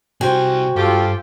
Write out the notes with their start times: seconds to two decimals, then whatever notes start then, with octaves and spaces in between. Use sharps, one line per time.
0.21 C3 G3 F#4 C5 G5 G#5
0.76 G2 F4 G4 A4